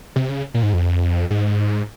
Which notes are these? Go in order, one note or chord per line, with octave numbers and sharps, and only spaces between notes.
C3
C#3
A#2
G#2
F2
G#2